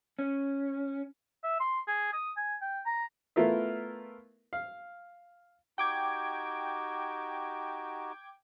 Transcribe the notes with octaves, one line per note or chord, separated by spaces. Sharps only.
C#4
E5
C6
G#4
D#6
G#5
G5
A#5
A3 B3 E4 F4 A#4 E5
F5
D#4 F#4 G4 G5 D6 G#6